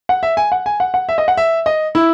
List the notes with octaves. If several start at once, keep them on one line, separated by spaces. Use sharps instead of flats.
F#5
E5
G#5
F#5
G#5
F#5
F#5
E5
D#5
F#5
E5
D#5
E4